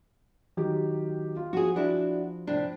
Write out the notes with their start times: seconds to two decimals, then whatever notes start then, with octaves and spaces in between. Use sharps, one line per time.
0.57 D#3 F#3 G4
1.36 F4
1.53 F3 F#4 G#4
1.76 D4 E4 F#4
2.47 A2 C3 D4